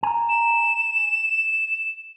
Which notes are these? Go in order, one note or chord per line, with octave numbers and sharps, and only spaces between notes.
G#5 A#5
E7